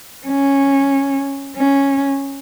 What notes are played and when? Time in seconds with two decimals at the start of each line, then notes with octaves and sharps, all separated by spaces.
0.26 C#4
1.56 C#4